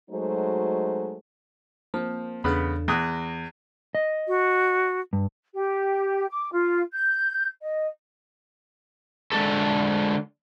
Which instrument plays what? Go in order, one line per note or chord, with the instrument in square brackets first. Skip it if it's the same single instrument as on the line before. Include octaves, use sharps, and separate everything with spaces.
[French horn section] F#3 G#3 A3 D#4 F#4 C5
[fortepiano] F3 [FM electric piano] A#3 C4
[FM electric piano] E2 D4 A4 [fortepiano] C#3 B3 B5
[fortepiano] E2 D#6 F#6 [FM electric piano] A#6
[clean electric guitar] D#5
[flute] F#4
[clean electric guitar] G2
[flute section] G4
D6
F4
G6
D#5
[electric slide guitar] D3 G#3 G#4 A4